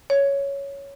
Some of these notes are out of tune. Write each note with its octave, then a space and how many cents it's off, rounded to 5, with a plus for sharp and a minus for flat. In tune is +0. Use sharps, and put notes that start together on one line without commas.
C#5 +5